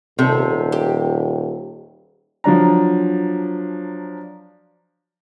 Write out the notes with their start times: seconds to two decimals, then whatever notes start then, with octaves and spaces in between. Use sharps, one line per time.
0.19 D#1 C3 A4
0.72 G4
2.44 F3 F#3 D4 A#5